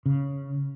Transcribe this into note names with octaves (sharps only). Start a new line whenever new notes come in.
C#3